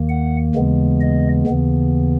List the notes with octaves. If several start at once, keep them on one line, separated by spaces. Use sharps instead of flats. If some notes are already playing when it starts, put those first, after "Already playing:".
Already playing: D#2 D#3 A#3
F#5
D#2 C#3 E3 G#3 B3
D#5
D#2 C#3 E3 B3